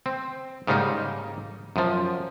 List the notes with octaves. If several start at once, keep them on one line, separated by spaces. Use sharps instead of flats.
C4
G#2 C#3 G3 A#3 D#4
F#2 F3